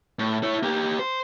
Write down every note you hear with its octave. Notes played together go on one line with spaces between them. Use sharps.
A2
E4 C#5
A#3 G4
C5